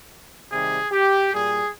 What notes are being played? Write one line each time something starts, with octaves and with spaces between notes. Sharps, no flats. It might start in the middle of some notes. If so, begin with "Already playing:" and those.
C3 D#3 G3 G#4
G4
A#2 G3 G#4